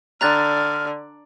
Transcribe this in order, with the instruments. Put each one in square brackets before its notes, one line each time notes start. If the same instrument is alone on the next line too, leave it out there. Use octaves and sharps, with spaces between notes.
[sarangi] D3 [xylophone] A#5 F#6 A6 [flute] F6